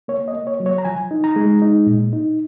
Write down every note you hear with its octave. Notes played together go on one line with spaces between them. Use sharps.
A#3 C#5
D#5
A#3
C#5
F#3
C#5
A#5
F3 G#5
D#4
A#5
G#3
D#4
A#2
D#4